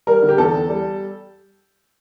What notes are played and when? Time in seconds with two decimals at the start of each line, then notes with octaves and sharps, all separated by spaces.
0.07 G3 A#4
0.23 D3
0.29 G4
0.38 E2 A4
0.54 E2
0.69 G3